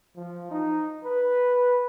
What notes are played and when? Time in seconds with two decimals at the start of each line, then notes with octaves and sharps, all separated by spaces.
0.16 F3
0.51 D#4
1.04 B4